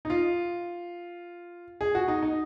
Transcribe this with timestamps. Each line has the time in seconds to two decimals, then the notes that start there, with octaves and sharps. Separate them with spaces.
0.05 D#4
0.10 F4
1.81 G#4
1.95 F#4
2.08 D#4
2.22 D#4